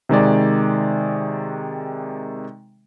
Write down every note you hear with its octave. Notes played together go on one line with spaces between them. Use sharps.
C3 D#3 G#3 D5